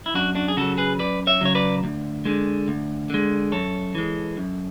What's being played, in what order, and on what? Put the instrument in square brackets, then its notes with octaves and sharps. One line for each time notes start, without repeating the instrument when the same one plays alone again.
[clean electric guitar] E4
F#2 D4 F#4
D4 F#4
G#4
C#3 F#3 F#4 A4
G#4 B4
F#2 B4 D5
C#5 E5
C#3 F#3 C#5
B4 D5
D2
D3 G#3
D2
D3 G#3
F#2 A4 C#5
E3 G#3
F#2